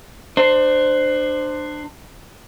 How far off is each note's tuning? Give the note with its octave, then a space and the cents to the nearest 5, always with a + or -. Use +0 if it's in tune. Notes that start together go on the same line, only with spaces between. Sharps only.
D4 +30 C5 -5